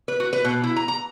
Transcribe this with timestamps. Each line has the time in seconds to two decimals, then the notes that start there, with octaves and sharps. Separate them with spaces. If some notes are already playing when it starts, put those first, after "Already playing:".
0.08 B4
0.20 F#4
0.33 B4
0.45 B2
0.63 E4
0.76 A#5
0.88 A#5